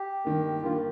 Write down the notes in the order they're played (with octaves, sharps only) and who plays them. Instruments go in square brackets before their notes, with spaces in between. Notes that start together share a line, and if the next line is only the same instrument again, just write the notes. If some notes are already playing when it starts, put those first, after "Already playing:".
Already playing: [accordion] G4
[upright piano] G2 D#3 A#3
[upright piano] G2 D#3 A#3 [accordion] F4
[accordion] G4